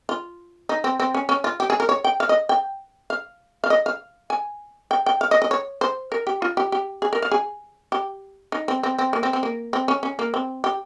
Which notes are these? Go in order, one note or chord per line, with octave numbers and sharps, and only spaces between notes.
F4
D#4
C4
C4
C#4
C#4
F4
G4
G#4
A#4
C#5
G5
F5
D#5
G5
F5
F5
D#5
F5
G#5
G5
G5
F5
D#5
D#5
C#5
C5
A#4
G4
F4
G4
G4
G#4
A#4
F5
G#4
G4
D#4
C4
C4
C4
A#3
C4
C4
A#3
C4
C#4
C#4
A#3
C4
G4